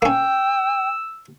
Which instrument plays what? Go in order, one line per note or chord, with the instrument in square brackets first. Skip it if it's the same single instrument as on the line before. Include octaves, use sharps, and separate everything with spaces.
[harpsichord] A#3 C#4 [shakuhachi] G5 [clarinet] E6